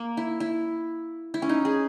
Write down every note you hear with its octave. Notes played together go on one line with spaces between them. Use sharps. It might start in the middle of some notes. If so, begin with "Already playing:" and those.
Already playing: A#3
E4
E4
E4
C#4
D#4
G#4